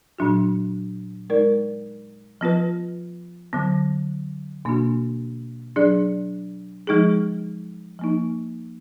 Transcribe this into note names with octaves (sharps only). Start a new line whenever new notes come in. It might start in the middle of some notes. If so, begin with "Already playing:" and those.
A#2 F#3 D4 F#4
G#3 D#4 A#4 D5
F3 B3 F4 B4
D3 F#3 B3
B2 A#3 D4 F#4
F#3 D4 G#4 D5
F3 G#3 D#4 G#4
F3 A#3 D#4